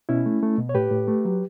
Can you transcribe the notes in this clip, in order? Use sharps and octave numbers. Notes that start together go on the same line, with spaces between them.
B2 C#4 E4
A3
A3
B2
C#5
A2 G4 B4
A2
A3
F#3